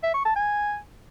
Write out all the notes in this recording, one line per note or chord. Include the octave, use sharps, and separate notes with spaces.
E5
C#6
A5
G#5